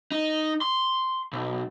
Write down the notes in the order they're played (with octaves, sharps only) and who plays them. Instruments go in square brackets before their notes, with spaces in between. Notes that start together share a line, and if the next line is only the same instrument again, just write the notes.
[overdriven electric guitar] D#4
C6
B1